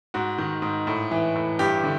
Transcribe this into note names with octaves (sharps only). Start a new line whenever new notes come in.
G#2 F#4
D#3
G#2
A2
E3
A2
G2 G4
D3